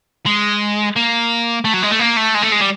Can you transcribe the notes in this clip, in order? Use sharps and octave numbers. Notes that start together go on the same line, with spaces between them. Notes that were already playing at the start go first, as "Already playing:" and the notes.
G#3
A#3
A3
F#3
G#3
A3
A#3
A3
G#3
A3
G#3
G3